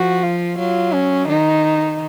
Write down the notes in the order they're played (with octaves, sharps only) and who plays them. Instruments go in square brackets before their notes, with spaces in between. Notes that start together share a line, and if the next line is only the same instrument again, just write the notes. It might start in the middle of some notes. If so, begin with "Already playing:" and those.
Already playing: [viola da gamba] F3 [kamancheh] F#4
[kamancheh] F4
[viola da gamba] F#3 [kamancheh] F4
[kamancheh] C#4
[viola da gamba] D#3 [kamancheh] D#4